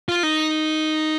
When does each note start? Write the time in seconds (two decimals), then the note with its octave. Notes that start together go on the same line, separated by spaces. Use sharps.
0.09 F4
0.23 D#4